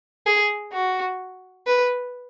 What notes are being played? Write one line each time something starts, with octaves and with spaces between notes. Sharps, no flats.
G#4
F#4
B4